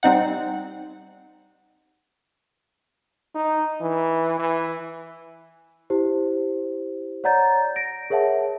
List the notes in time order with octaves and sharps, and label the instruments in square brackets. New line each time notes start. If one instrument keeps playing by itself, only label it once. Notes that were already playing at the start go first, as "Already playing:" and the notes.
[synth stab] G3 C4 D#4 F#5
[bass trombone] D#4
E3
E3
[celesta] E4 G4 C5
C#5 D5 F#5 A#5 G6 A6
A#6 D7
G#4 A#4 C#5 E5 F#5 A5